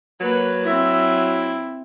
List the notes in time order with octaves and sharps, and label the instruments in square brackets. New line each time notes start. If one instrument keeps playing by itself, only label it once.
[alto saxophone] F#3 [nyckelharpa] A#3 B4
[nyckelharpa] C4 E5 [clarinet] E4